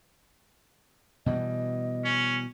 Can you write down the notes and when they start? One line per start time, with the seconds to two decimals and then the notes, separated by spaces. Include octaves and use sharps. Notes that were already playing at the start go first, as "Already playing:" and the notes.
1.26 B2 E3 G3 D#5
2.05 C#4